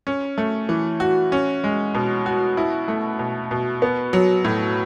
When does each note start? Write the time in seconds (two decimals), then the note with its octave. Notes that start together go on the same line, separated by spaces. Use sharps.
0.07 C#4
0.38 A3
0.69 E3
1.00 F#4
1.32 C#4
1.64 G#3
1.94 B2
2.26 F#4
2.57 E4
2.88 A3
3.19 B2
3.51 B2
3.82 B3
4.13 F#3
4.45 A2